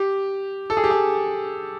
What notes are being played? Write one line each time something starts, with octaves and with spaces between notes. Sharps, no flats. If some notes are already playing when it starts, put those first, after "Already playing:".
Already playing: G4
A4
G#4
G4
G#4